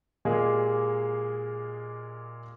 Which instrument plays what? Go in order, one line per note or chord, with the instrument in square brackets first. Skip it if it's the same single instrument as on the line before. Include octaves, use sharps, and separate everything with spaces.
[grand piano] A#2 G#3 A#3 G4 G#4